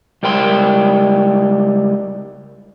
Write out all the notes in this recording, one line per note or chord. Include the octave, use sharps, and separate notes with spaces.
C#2 G3 A#4 G5 C6